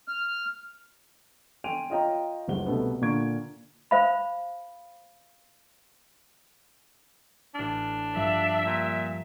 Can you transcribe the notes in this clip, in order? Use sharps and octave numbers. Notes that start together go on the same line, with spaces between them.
F6
G5 G#5 C6 D7 D#7 F7
F4 C#5 D#5 F5 G5 A#5
F#1 C#2 G3 C5 F#5 G7
C2 B2 A3 B3
A#2 D3 A#3 C#6 G#6 D7
C5 F5 B5
A1 D4 F6
G2 F3 E5
A#2